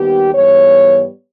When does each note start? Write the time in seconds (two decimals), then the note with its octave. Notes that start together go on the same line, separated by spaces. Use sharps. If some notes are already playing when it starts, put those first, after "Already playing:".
Already playing: D#2 D#3 G3 B3 G4
0.34 G#2 E3 G3 B3 C#5